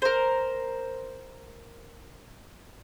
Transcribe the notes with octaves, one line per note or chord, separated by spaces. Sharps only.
A#4 C5